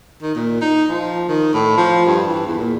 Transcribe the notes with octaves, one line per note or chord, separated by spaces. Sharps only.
D#3
A#2
D#4
F3
D#3
A2
F3
G2
E3
E2
A#2